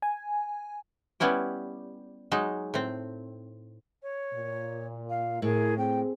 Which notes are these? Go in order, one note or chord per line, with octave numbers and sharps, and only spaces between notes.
G#5
G3 B3 C#4 E4 G4
F#3 G#3 D#4
A2 C4
C#5
A#2
F5
A2 E4 G#4 A#4
C4 G#4 G5